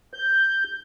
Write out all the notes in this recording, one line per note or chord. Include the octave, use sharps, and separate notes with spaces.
G6